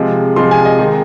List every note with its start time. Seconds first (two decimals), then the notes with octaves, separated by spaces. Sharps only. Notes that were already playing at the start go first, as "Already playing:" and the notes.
Already playing: C3 F3 G#3
0.36 C3 F3 G#3 C6
0.51 G#5
0.65 D#5
0.79 D#3 G#3